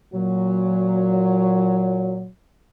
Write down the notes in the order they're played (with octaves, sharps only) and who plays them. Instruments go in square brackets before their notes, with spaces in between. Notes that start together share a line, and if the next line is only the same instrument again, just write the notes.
[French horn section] A#2 F#3